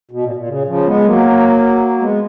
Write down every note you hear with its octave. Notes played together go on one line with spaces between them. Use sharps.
B2
A#2
A#2
C#3
C#3 F3
G#3 B3
F#3 A#3
G#3 B3